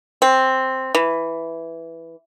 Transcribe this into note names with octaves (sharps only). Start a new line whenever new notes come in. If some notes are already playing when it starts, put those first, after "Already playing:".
C4
E3